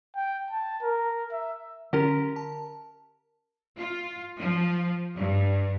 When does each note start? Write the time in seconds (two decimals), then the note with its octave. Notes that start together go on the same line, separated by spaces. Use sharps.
0.16 G5
0.51 A5
0.82 A#4
1.32 E5
1.93 D3 C#4 G4 A#4
2.36 A5
3.76 F4
4.39 F3
5.16 G2